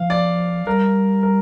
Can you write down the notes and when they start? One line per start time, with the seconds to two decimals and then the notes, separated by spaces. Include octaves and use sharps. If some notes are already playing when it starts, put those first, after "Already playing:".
Already playing: F3 F5
0.10 D5
0.66 G3 A#4
1.23 A#4